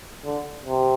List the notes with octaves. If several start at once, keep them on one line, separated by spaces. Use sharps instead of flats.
D3
C3